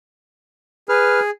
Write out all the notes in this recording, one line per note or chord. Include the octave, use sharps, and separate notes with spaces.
G#4 B4 F6